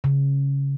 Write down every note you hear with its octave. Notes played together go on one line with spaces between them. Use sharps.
C#3